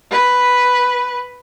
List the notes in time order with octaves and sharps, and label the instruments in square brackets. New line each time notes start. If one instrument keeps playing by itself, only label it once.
[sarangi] B4